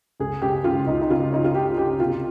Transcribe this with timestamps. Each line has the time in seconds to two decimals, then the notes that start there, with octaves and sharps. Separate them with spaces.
0.20 C#2 G#4
0.42 C#2 G4
0.64 C#3 F4
0.87 C#2 D#4
1.02 D#4
1.10 C#3 F4
1.32 C#4 D#4
1.44 F4
1.55 C#4 G4
1.77 C#4 G4
1.99 C3 F4